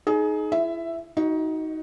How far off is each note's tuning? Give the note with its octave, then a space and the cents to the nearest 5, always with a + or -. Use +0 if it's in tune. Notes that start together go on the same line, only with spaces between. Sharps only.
D#4 +0 G#4 +25
E4 +30 E5 +5
D#4 +20 F#4 +10 D#5 -15